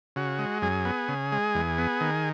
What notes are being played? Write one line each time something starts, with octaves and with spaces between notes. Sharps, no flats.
C#3 F#4
G#3
F#2 G#4
B3
C#3
G#3
E2
B3
D#3